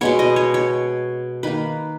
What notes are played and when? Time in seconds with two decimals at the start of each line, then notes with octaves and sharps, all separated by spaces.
0.01 B2 G#3 B3 C#5
0.19 D#5
0.36 C#5
0.54 C#5
1.43 D#3 A#3 B4